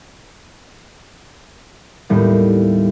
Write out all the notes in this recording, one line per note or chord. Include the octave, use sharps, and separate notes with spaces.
D#2 A2 G3 B3